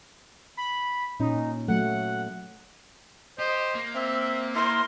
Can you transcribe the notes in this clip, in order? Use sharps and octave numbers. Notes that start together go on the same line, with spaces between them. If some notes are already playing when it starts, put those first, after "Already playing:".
B5
A#2 C#4 D#4
F#3 A3 F#5
G4 C5 D#5
A#3
C4 E5
E4 A#4 C6